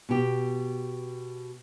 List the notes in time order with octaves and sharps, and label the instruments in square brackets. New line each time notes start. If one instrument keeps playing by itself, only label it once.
[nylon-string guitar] B2 G4